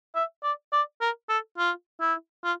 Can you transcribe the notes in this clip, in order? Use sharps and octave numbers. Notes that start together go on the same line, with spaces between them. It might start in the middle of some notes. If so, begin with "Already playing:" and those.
E5
D5
D5
A#4
A4
F4
E4
F4